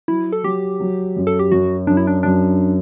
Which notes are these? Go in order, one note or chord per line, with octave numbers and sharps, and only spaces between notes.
F#3 E4
A4
F#3 G4
F#3
F#2
A4
G4
F#2 F#4
F#2 D4
E4
D4
F#2 D4